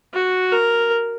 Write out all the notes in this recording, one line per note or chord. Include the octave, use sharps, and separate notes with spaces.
F#4
A#4